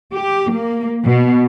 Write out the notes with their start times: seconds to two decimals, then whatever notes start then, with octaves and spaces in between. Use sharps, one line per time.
0.15 G4
0.51 A#3
1.05 B2